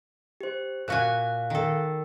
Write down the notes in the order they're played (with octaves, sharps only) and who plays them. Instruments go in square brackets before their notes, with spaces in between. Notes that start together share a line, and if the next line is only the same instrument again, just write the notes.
[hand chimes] G4 C5
[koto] A#2 F#4 G#5 [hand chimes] F5 F#6
[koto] D#3 A4